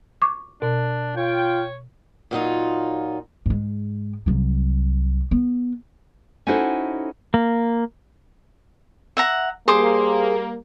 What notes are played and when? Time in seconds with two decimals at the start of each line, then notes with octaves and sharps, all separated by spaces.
0.22 C#6 D6
0.62 B2 D4
1.17 F4 C#5 G5
2.31 A#2 F#3 D#4 F4
3.46 G#2 G#3
4.26 C2 F#3
5.31 B3
6.47 C#4 D#4 E4 F#4 A4 C5
7.34 A#3
9.17 E5 F#5 A#5
9.68 G3 A#3 G#4 C5 C6 D6